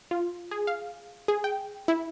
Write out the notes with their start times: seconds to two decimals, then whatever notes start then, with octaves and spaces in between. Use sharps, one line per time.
0.11 F4
0.51 G#4
0.67 F5
1.28 G#4
1.44 G5
1.88 E4